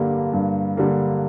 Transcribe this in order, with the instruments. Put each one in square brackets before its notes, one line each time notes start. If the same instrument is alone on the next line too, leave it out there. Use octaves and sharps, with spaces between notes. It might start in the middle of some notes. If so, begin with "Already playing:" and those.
Already playing: [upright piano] G2 D3 G3 A#3
G2
D3 G3 A#3